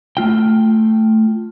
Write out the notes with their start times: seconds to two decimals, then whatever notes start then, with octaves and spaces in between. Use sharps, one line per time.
0.17 A3 F4 G5